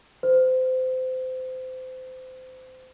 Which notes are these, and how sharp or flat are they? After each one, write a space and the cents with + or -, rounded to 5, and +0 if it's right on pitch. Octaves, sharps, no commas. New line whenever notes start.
C5 -25